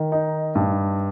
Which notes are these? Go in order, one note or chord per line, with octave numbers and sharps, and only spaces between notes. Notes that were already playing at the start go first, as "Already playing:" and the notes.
Already playing: D#3
D#4
G2